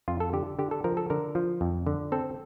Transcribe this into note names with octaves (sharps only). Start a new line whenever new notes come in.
F2 F4
A4
D3 G4
D3 G4
A4
F3 A#4
A4
D3 A#4
F3
F2
D3
C4 A4